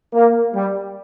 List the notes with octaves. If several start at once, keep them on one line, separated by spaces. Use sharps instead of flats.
A#3
G3